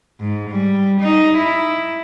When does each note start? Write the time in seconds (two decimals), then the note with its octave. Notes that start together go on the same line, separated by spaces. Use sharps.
0.20 G#2
0.51 G3
1.00 D#4
1.37 E4